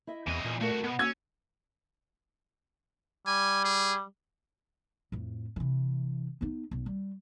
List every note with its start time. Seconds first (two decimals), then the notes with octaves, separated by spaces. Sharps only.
0.07 E4 D#5 E5
0.27 E2 E3 C4 D#5
0.45 E2 A#2 G#5
0.61 C2 A3 F#4 A#4
0.84 B2 B3
0.99 A#3 C#4 F#4 E6 G#6
3.27 G3 G#5
3.64 G#4
5.12 F2 A2
5.56 C3 E3
6.41 B3 D#4
6.71 B1
6.86 G3